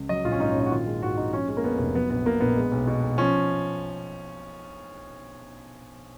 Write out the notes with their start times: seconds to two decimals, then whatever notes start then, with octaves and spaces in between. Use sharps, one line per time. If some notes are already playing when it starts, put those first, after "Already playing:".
Already playing: C#2
0.09 F#3 D#5
0.24 A#1 F4
0.32 C#4
0.40 G#2 D#4
0.50 C#4
0.56 A#1 D#4
0.66 F#4
0.71 D#3 F4
0.87 G#3
1.02 G#2 F#4
1.17 A#1 D#4
1.33 F3 C#4
1.48 G#3 C#4
1.57 A#3
1.63 F2 B3
1.79 F1 A#3
1.94 F#3 B3
2.10 A#1 B3
2.25 A#2 A#3
2.41 A#1 B3
2.56 G#3
2.72 B1
2.87 B2
3.03 B1
3.18 F3 C#4